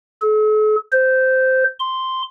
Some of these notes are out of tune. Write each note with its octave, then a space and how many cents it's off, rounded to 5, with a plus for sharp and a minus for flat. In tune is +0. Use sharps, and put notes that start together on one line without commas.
A4 -45
C5 -10
C6 -5